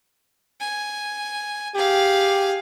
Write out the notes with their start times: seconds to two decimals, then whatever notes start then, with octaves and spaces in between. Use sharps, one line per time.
0.60 G#5
1.75 G4 G#4 F5